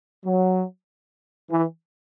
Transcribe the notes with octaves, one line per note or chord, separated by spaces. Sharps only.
F#3
E3